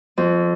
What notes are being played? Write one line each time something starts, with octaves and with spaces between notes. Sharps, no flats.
F2